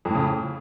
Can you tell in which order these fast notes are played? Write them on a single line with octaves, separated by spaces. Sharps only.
F2 A2 C#3